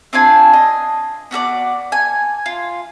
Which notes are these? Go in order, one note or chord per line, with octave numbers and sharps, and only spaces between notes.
C4 D4 F4 G#5
D#5
B3 F#4 A4 D5
G#5
F4